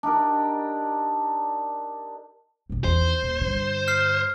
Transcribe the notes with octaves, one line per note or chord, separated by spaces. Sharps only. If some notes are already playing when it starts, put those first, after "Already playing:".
D4 D#4 G4 A#4
F1 B1
E2 D#3 C5
D#1
G2 D3
F6 C7